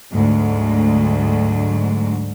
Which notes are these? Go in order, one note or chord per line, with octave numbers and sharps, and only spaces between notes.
D2 G#2 F#3